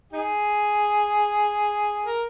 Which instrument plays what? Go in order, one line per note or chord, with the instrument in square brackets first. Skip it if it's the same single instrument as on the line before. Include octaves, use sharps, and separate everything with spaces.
[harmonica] D#4 G#4
A#4